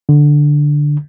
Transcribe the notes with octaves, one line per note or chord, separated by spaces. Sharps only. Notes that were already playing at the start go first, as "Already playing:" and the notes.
D3